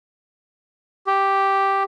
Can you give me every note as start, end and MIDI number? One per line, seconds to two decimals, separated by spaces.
1.07 1.83 67